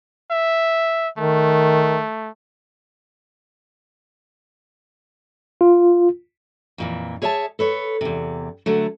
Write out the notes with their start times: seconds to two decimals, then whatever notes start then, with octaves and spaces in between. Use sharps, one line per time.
0.31 E5
1.18 D#3 A3
5.61 F4
6.78 F2 A#2 E3
7.22 G#4 C#5 E5 G#5 A5
7.59 A4 B4 C#5
8.01 E2 C3
8.66 D3 F#3 A3